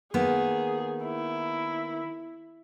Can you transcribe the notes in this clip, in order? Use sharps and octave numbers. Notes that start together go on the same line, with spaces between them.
D#3 A#3 B3 G#4
E4